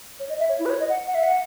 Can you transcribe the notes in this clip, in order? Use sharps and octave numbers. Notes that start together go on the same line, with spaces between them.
C#5
D#5
E5
C#5
E4
B4
C#5
D#5
F#5
F#5
E5
F#5